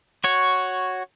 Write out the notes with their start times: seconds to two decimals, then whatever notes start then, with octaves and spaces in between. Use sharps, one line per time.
0.24 F#4 C#5